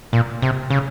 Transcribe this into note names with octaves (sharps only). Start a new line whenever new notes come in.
A#2
C3
C#3